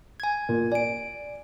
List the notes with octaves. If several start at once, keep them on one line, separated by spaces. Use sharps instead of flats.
G#5 G#6
A#2
D5 G#5 D7